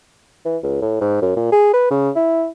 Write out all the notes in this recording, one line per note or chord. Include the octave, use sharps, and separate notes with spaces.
E3
C#2
A2
G#2
F#2
A#2
G#4
B4
C#3
E4